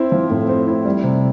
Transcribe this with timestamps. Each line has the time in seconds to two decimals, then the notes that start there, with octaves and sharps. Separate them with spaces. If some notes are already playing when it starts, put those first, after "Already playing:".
Already playing: C4 E4
0.12 F3
0.30 A2
0.49 C4
0.67 E4
0.85 G3
1.04 C3